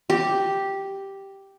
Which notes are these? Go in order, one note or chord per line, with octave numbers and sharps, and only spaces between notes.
G4